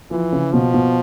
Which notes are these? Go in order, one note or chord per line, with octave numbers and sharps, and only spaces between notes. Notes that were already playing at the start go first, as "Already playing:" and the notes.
E3 F3
C#3
B2 F3
B2